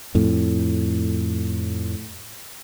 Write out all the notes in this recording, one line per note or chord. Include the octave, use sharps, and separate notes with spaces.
F2 A2